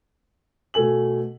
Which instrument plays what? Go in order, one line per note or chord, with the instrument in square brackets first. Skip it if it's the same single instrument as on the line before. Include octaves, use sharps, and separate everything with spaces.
[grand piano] B2 A3 A4 G#5 F#7